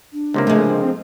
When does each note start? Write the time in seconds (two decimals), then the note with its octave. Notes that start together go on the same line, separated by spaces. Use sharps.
0.13 D4
0.34 C#2 C3 A#3
0.47 F3 G#3 A3
0.69 C4